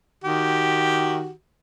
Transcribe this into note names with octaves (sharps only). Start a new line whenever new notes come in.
D#3 F#4 G4